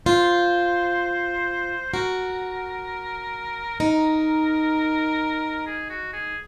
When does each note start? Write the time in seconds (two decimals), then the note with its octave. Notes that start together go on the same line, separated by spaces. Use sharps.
0.06 F4 C5
1.94 F#4 A#4
3.80 D#4 A#4
5.67 G#4
5.90 F#4
6.14 G#4